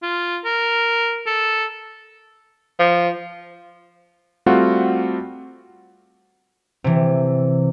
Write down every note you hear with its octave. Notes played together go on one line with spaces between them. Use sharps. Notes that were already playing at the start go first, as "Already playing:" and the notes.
F4
A#4
A4
F3
G3 A3 C4 F4 F#4 F#5
C3 E3